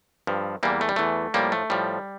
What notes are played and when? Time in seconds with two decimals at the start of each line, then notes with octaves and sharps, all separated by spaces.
0.27 G2 F3
0.63 E2 E3 G3 A#3
0.81 A3
0.89 G3
0.96 E2 E3 A3
1.34 A2 F3 G3 A#3
1.52 A3
1.70 A2 F3 G3